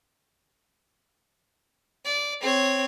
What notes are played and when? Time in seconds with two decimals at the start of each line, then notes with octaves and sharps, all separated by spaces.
2.05 D5
2.41 C4 C#5